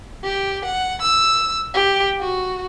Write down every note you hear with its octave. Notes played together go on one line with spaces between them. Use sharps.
G4
F#5
E6
G4
F#4